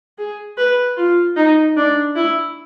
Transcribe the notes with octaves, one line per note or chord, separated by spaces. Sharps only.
G#4
B4
F4
D#4
D4
E4